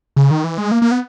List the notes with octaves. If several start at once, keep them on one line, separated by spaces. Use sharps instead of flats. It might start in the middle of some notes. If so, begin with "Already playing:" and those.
C#3
D#3
E3
G#3
A#3
A#3
B3